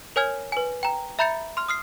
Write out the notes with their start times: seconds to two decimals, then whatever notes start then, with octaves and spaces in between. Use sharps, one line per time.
0.16 A#4 C#5 G#5 F6 G#6
0.52 B4 G#5
0.83 G5 A#5
1.19 E5 A#5 B5 G6 A6 C#7
1.57 C6 F6
1.68 D#6 F6 C7